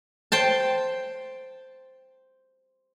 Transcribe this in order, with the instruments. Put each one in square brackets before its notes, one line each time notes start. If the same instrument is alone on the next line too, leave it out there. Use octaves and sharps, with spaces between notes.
[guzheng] C5 G5 A5